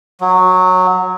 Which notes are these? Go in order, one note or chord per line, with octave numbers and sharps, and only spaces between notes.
F#3